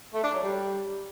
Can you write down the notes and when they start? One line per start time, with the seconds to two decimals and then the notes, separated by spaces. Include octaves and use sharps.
0.14 A3
0.23 D4
0.33 F#3
0.43 G3